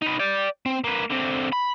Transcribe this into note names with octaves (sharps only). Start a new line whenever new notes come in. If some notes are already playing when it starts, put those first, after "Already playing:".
D#4 B4
D5 G5
C4
A#3 B4
D3 C4
B5